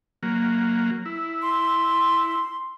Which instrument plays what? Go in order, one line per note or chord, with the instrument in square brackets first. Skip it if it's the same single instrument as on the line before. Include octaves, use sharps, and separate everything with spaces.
[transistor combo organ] F#3 A#3
E4
[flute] C6